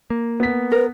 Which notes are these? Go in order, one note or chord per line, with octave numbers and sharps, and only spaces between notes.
A#3
B3 B6
A#4 B4